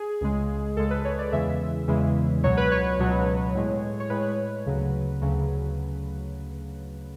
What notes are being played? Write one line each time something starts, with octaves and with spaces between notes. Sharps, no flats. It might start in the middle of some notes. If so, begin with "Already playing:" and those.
Already playing: G#4
C#2 C#3 G#3
C#2 C#3 G#3 A4
B4
C#5
D5
E2 C#3 E3 G#3 E5
E2 C#3 E3 G#3
C#2 B2 F#3 C#5
B4
C#5
C#2 B2 F#3
A2 G#3
C#5
A2 G#3 B4
D2 C#3 F#3
D2 C#3 F#3